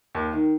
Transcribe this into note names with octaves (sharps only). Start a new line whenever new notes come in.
D#2 D#3
D#3